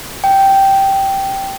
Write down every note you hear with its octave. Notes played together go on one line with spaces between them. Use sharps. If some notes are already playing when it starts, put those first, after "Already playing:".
G5